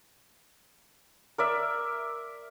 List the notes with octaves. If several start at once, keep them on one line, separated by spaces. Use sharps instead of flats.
A#4 D5 E5